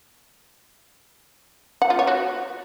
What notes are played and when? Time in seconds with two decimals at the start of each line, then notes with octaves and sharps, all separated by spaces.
1.82 F#5
1.90 F4
1.99 C#5
2.07 F#4